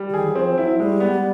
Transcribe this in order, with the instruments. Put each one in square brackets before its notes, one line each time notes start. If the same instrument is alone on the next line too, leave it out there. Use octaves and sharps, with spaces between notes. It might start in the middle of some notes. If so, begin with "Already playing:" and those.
Already playing: [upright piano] G3
[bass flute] D3
[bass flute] D#3 [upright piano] G#4
[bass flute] F#3
[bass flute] F3 [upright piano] C4
[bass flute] F#3 [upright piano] E4
[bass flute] G3 [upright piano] G#3
[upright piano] B3
[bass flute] G3